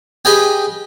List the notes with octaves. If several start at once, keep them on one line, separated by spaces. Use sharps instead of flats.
G4 G#4 B4 D#5 G5 G#5